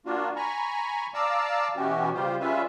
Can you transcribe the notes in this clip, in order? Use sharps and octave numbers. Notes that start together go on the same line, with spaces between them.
A#3 D4 F4 F#4
G#5 A#5 B5 C#6
D5 F5 A5 A#5 D6 E6
B2 E3 B3 C#4 F#4 G4
C#3 G3 F4 G4 C5
G3 G#3 C#4 F4 B4 E5